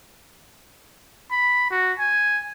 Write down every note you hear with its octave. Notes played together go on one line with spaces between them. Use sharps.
B5
F#4
G#5